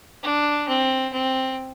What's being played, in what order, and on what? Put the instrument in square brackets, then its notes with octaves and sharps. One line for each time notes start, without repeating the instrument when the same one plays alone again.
[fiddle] D4
C4
C4